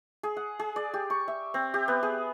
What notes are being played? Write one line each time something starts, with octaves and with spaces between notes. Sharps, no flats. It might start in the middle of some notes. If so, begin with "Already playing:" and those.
G#4
F#5
G#4
D5
G4
C#6
E5
C4
G4
B3
G#4